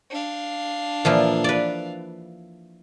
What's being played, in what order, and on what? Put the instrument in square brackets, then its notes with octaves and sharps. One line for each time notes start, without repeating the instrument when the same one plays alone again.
[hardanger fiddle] D4 F5
[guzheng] A#2 E3 F3
B4 D5